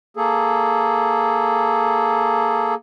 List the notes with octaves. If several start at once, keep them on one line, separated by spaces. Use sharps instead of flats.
A#3 G#4 A4